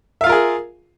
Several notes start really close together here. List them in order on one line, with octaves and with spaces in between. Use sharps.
E5 F5 F4 A#4 G#4